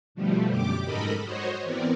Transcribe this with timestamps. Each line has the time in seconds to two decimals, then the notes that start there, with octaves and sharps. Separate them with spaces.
0.15 B2 D3 F3 G3 A3
0.47 F#2 G4 D6
0.83 G#2 A4 A#4 D#5 B5
1.23 F#4 C5 C#5 D#5
1.64 E3 B3 C4 A#4 D5